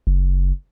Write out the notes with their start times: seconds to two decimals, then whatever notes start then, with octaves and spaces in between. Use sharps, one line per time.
0.07 F#1